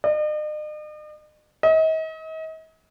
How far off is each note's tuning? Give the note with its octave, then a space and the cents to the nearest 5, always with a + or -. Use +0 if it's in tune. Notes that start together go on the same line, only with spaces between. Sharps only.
D#5 -45
D#5 +40